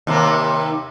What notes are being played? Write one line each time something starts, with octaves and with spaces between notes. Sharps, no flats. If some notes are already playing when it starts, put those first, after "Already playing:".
D#2 C3 A#3